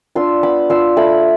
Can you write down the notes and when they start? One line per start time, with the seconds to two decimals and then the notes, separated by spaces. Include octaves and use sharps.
0.15 D4 F4 C6 E6
0.43 B3 B5 D6
0.70 D4 F4 C6 E6
0.97 A3 B5 D6